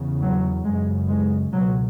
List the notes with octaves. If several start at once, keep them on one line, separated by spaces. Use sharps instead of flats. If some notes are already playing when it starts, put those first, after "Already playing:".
Already playing: E2 C#3
F#3
F#2 C#3 G#3
G#3
C#2 B2 F#3